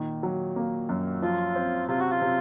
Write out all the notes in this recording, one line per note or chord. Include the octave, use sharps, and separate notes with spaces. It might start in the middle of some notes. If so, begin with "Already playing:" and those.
Already playing: A#2 D#3
F#3
A#3
F#2
F3 F4
C4
C3 F4
F#4
F4
C3